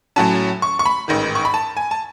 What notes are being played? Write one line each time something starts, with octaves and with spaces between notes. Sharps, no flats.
A2 F#3 C#4 A5
C#6
C#6
B5
A1 G#2 D#3
C#6
B5
A5
G#5
A5